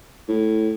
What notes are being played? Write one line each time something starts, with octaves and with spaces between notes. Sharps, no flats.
A2